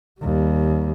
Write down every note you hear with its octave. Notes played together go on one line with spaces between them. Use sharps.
D#2 G3